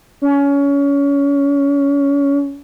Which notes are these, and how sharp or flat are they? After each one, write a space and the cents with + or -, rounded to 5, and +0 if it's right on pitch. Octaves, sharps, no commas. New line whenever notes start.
C#4 +25